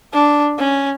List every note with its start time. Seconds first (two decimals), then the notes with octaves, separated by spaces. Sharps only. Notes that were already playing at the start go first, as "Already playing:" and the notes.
0.13 D4
0.58 C#4